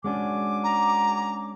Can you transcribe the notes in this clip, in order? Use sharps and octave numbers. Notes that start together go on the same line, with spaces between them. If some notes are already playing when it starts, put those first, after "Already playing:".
G#3 C#4 D4 F#4 G#5 D6
A#5